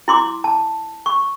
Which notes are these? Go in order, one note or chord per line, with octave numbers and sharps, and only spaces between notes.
E4 C6 D6
A5
C#6